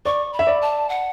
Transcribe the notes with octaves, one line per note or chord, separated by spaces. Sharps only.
D5 C#6
B5
E5
D5
A5
F#5